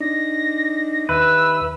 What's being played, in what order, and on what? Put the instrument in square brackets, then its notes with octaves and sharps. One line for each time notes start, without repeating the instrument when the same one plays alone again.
[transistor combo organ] D4 D#4 [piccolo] A#6
[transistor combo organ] D#2 E5 [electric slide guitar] B4 [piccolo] E6